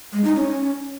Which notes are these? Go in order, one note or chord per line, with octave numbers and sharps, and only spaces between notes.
G#3
D#4
C#4